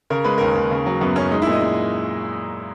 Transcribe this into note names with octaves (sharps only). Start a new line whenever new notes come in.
C#3 A#4
G#3 B4
D#2 A#4
D#2
C#3
F#3
F#2 B3
F#2 C#4
G#3 D#4
E4
A#2 D#5
G#3